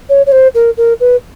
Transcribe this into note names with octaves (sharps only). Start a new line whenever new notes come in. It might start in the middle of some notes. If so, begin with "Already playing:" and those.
C#5
C#5
C5
A#4
A#4
B4